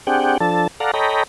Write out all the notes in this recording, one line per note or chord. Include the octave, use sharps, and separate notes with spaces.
C4 D4 G4 G#4 F#5 G5
F3 D4 A4 A5
A4 D5 F5 F#5 A#5
A4 C#5 D#5 G5 A#5 B5